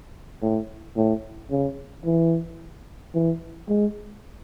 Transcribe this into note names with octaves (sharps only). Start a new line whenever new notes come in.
A2
A2
C#3
E3
E3
G#3